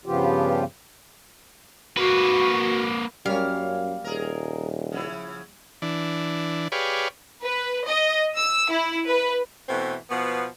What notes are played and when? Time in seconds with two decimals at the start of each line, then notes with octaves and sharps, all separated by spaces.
0.06 G2 C#3 F3 B3 F4 G4
1.97 A#3 F#4 B4
3.26 F#2 G3 A#3 C#4 C#5 F5
4.04 D#1 G#4 A#4
4.92 C#3 F3 E4
5.82 E3 D4
6.72 G4 G#4 B4 C#5 D5 F5
7.42 B4
7.86 D#5
8.36 E6
8.71 E4
9.09 B4
9.69 B2 E3 A3 C4
10.10 B2 F3 B3